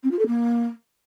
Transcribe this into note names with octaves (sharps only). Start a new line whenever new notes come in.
C4
F4
A4
A#3